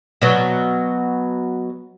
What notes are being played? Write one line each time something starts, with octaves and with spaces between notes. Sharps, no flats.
B2 F#3